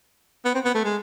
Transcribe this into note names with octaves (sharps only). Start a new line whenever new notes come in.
B3
C4
B3
A3
G#3